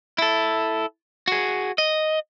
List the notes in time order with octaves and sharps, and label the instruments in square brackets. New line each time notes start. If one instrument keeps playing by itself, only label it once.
[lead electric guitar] E4 A4
F#4 G#4
D#5